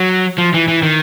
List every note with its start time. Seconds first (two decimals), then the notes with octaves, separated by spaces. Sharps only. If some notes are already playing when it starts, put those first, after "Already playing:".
Already playing: F#3
0.38 F3
0.54 E3
0.68 E3
0.83 D#3